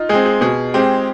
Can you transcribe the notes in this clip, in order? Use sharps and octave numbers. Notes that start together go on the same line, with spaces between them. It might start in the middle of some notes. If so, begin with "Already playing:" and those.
Already playing: D#4 F4
G#3 C4 G#4
G#4
B2 G#4
G#3 C4 G4